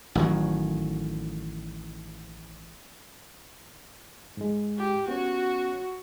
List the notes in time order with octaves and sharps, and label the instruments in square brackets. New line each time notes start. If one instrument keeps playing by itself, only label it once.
[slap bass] A1 D#3 F#3
[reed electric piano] G#2 G#3
[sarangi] G4
[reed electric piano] B3 C#4 C#5 [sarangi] F#4